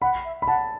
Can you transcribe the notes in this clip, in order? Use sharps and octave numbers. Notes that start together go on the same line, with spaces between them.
F#5 B5
E5
B5
F#5 A5